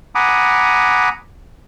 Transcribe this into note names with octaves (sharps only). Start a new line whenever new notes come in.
F#5 G#5 A#5 B5 D6 D#6